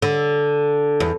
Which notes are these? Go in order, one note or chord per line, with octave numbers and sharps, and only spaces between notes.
D3
E2